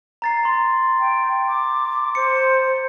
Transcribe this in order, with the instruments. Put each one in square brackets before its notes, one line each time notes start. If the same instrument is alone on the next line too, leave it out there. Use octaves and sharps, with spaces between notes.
[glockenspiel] A#5 A6 C7
A#5 C6
[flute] G5
D6
[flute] C5 [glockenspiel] C#7